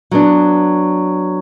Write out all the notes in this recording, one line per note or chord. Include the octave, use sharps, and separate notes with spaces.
F#3 B3 D4